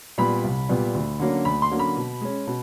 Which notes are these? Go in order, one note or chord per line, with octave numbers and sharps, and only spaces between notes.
A#2 G3 B3 B5
C2
A#2 G3 B3
D2
D3 F#3 A#3 C#4
D2 B5
C6
D3 F#3 A#3 C#4
B5
B2
G#3 C#4
B2